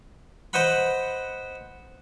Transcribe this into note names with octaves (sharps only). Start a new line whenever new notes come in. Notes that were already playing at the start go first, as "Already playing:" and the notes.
B4 C5 D#5 F#5 B5